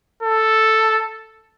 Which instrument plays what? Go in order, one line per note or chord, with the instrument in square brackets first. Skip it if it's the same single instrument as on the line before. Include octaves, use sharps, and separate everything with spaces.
[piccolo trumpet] A4